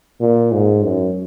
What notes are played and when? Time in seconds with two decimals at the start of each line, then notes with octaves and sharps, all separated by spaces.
0.20 A#2
0.52 G#2
0.83 F#2